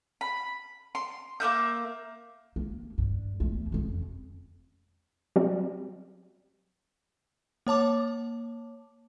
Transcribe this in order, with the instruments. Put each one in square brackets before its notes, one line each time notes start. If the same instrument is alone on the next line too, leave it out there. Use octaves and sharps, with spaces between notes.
[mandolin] B5
C6
A#3 B3 E5 G6
[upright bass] A#3
G2
E2 A3
F2 C#3
[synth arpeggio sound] F#3 G3 C4
[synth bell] A#3 C#5 A5 D6